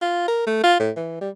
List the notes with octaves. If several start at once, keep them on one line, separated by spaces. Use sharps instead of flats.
F4
A#4
A3
F4
A2
E3
G3